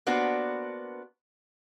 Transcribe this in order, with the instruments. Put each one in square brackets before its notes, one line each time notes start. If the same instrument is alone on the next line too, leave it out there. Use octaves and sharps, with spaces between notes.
[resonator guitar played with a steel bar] A#3 B3 D4 F#4 B4 C5